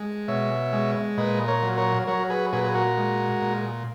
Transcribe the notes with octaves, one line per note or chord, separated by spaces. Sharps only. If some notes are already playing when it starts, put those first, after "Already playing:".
Already playing: G#3
B2 C#5 E5
G#3
A#2 B4 D#5
A#4 C#5
F#3
A#4 C#5
F#3 A#4 C#5
G#4 B4
A#2 G#4 B4
G#4
F#4 A#4
G#3
A#2